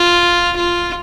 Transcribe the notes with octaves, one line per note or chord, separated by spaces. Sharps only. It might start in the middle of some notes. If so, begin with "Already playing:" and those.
Already playing: F4
F4